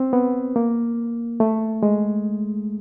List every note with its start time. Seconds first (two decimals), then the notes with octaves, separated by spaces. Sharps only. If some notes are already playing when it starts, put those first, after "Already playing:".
Already playing: C4
0.13 B3
0.56 A#3
1.40 A3
1.83 G#3